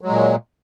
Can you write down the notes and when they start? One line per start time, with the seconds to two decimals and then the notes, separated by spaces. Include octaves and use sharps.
0.01 F#3
0.05 G#3
0.10 A#2